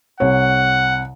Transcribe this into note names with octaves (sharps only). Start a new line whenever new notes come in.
C2 C#5 F#5